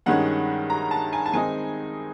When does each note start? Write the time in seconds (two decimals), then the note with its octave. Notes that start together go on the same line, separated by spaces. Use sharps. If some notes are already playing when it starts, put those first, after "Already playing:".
0.06 G2 D#3 G#3 C#4 F#5
0.70 A#5
0.91 A5
1.13 G#5
1.26 A5
1.33 D#3 G#3 C4 D#4 G#5